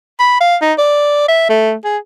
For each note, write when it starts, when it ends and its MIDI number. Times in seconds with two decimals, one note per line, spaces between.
0.20 0.40 83
0.41 0.56 77
0.62 0.73 63
0.78 1.26 74
1.28 1.48 76
1.49 1.74 57
1.84 1.97 68